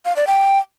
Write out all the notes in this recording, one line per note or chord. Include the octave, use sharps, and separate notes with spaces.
F5
D5
G5